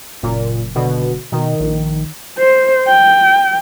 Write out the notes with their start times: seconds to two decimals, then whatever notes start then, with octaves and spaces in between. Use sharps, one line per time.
0.23 F#1 A#2
0.75 B2 D3
1.32 B2 D#3
1.60 A#1
2.38 C5
2.88 G5